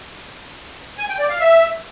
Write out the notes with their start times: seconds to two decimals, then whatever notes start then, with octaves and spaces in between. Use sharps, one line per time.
0.98 G#5
1.09 G5
1.19 D5
1.29 F5
1.40 E5